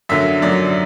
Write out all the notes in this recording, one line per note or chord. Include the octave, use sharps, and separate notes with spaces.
F#2 D3 F#3 E5
F#2 D3 F#3 D5